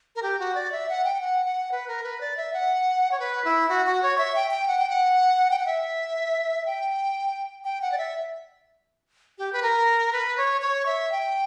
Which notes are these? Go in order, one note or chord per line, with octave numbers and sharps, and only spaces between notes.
A#4
G4
F#4
D5
E5
F#5
G5
F#5
F#5
B4
A#4
B4
D5
E5
F#5
C#5
B4
E4
F#4
F#4
C#5
E5
G5
G5
F#5
G5
F#5
G5
F#5
E5
G5
G5
F#5
D5
E5
G4
B4
A#4
B4
C#5
C#5
E5
G5